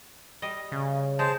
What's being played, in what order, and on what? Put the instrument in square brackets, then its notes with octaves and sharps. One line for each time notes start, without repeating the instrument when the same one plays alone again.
[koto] G3 D#5
[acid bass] C#3
[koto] G#3 [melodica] C5 A5